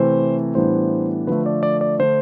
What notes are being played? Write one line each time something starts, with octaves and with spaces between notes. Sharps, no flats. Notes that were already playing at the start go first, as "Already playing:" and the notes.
Already playing: C3 E3 A3 C4 C5
A2 E3 G3 B3 D4 C5
D3 F3 A3 B4
D5
D5
D5
D3 A3 D4 C5